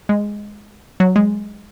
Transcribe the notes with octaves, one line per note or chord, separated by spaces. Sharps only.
G#3
F#3
G#3